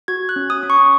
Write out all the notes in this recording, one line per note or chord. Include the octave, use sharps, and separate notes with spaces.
F#4 G#6
F#6
C#4
D#6
C#4
C#6